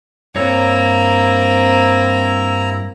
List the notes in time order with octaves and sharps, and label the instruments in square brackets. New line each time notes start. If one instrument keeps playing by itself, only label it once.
[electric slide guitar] G2 C#5 [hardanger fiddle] A#3 C4 [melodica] E4 A#5